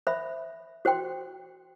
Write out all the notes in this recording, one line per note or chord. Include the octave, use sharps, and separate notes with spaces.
C5 E5 B5
F#4 C5 G5 C6